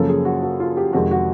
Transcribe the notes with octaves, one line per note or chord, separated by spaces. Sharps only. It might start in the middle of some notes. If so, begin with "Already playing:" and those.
Already playing: F#2 C#3 F3 A#3 A4
G#4
F#4
F#4
F4
G4
F2 C3 D#3 G#3 F#4
F#4